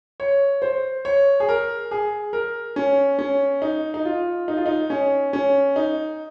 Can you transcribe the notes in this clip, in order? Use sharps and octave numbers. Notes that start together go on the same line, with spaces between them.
C#5
C5
C#5
G#4
A#4
G#4
A#4
C#4
C#4
D#4
D#4
F4
D#4
F4
D#4
C#4
C#4
D#4